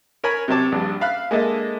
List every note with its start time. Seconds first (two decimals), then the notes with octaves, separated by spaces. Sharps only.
0.24 A#4 C#5 G#5 B5
0.48 C3 F#3 C4 C#5 A5 D6
0.72 A#1 G2 D4
1.01 E5 F5 B5 F6 F#6
1.31 G#3 A#3 D4 A4 D#5 E5